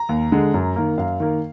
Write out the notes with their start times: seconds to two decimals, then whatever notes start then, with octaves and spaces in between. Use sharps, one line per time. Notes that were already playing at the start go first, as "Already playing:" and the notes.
Already playing: A#5
0.09 D#2
0.32 D3 G#3
0.54 F#2
0.76 D#3 A#3
0.98 F#2 F5
1.20 D#3 A#3